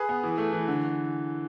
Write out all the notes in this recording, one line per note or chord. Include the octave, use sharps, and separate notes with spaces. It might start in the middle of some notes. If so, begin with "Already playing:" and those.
Already playing: G#4 B4
B3
E3
A3
E3
D3